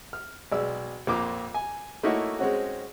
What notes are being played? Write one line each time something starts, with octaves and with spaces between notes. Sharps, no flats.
F6
B1 G#3 D5 E6
A#1 F2 A#3 F4 D6
G#5
A3 A#3 D#4 E4 F#4 C#5
G#3 C4 C#4 F#4